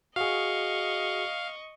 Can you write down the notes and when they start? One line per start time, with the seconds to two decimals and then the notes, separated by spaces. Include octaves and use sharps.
0.16 F#4 G#4 D#5 F5 C#6